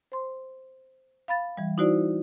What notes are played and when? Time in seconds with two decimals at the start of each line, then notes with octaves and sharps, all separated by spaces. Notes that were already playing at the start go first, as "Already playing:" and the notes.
0.12 C5 C6
1.28 F5 B5 A6
1.57 E3 G3
1.78 D#4 E4 F#4 C5 D5